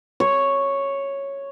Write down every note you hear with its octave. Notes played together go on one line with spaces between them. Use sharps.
C#5